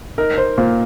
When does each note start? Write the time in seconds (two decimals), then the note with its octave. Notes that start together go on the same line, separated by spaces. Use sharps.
0.18 D#4 A#4
0.38 C5
0.58 A#2 C5